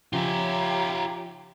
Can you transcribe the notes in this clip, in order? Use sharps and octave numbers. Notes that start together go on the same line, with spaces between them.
C#3 F3 F4 G4 C#5 E5 A#5